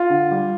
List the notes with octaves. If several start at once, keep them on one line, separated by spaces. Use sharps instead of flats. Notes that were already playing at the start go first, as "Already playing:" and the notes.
Already playing: F4
D3
G3